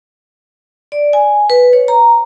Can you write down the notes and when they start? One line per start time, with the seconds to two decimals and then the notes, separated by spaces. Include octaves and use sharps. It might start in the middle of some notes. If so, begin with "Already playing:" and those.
0.92 D5
1.13 G#5
1.50 B4
1.73 C#5
1.88 A#5